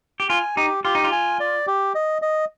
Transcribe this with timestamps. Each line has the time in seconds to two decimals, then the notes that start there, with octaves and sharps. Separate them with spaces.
0.20 G4
0.30 F4 G#5
0.57 D#4 G4
0.84 F4 G4
0.95 D#4
1.04 F4
1.12 G#5
1.40 D5
1.67 G4
1.95 D#5
2.22 D#5